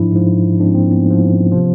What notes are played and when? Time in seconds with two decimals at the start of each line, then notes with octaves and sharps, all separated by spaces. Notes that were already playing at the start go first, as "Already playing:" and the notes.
Already playing: G#2 F3 D4 E4
0.13 G#2 F3
0.59 G#2 F3 C4 D4
0.75 A#3 C4
0.91 B3 C#4
1.06 G#2 F3
1.52 C3 F3